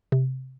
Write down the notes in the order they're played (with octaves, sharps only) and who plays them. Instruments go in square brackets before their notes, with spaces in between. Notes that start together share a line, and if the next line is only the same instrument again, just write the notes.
[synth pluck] C3